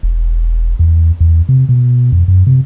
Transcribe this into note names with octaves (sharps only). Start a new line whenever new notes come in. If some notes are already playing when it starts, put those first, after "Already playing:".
E1
E2
E2
C3
B2
F2
F#2
C3